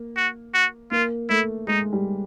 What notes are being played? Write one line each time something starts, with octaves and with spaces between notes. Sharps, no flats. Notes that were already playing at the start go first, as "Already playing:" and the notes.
Already playing: A#3
F#4
F#4
A#3 F4
A3 E4
G#3 D#4
G3